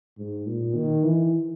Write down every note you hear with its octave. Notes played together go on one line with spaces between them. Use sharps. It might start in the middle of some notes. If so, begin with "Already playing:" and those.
G#2
A#2
D#3
E3